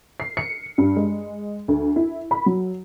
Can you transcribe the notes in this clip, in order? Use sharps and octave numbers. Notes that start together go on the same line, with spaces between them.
C7
C#7
G2
G#3
D2
E4
B5
F#3